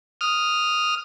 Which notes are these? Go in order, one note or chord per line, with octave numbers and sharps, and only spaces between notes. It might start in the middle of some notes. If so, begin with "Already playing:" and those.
D#6 F6